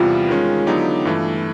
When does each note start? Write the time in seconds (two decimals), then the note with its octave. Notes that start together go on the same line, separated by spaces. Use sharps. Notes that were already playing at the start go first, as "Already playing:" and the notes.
Already playing: E2 C3 E3 G3 B3 F4
0.28 D#3 G#3 C#4
0.67 D3 F#3 B3 D#4 G4
1.05 G2 E3 A3